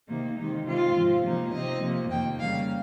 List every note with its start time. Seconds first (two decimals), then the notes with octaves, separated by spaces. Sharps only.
0.08 C3 D#3 A#3 D#4
0.38 C3 D#3 G#3 D#4
0.66 C3 D#3 G#3 C4 F4
0.95 G#2 F3 C4
1.24 C3 F3 A#3 D#4
1.53 C3 F3 C4 D#4 D#5
1.82 C3 F3 A#3
2.10 F2 D#3 A#3 G5
2.39 C#3 G3 A#3 F5